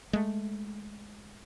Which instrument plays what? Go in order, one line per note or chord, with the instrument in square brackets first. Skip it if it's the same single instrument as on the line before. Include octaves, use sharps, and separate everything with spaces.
[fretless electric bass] G#3 A3